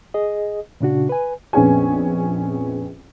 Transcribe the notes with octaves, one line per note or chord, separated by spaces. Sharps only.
G#4 D#5
A#2 C#3 D4 F#4
B4 G#5
A#1 F2 B3 C#4 G#4 G#5